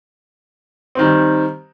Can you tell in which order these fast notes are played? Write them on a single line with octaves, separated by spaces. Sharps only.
C4 D#3 G3